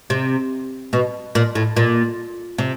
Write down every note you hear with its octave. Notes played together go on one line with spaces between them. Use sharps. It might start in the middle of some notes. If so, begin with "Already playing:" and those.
C3
B2
A#2
A2
A#2
C3